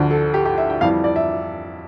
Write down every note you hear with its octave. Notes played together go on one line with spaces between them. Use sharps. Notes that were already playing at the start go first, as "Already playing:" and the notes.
Already playing: D2 D3 F3
A4
G4
G4
E5
G5
F2 E3 G3 F5
D5
E5